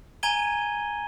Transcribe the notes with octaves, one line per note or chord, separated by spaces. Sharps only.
G#5 A#5 G#6 D#7 G7